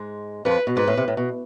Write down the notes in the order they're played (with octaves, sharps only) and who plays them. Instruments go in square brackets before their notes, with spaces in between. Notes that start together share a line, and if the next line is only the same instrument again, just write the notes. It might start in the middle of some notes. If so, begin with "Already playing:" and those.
Already playing: [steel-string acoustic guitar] G#2 G#3
[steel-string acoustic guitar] F2 F3 [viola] B4
[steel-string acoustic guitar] B2
[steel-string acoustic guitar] G#2 [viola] B4
[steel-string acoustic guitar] A2
C3
A2
B2